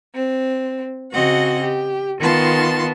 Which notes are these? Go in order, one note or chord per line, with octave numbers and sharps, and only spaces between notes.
C4
C#3 C4 F#4 D#5 F#5
G4
D#3 B3 F4 A5 C6